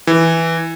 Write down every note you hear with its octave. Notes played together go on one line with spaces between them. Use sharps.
E3